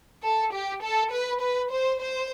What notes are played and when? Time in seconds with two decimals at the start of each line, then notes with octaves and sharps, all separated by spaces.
0.23 A4
0.53 G4
0.82 A4
1.11 B4
1.41 B4
1.71 C5
2.00 C5